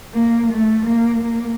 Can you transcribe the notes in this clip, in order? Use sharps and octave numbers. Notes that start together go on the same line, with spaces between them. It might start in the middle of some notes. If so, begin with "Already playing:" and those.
A#3
A3
A#3
A#3